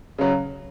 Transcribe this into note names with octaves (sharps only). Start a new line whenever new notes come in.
C#3 F#3